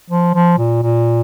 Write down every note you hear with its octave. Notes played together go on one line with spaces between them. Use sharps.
F3
F3
A#2
A#2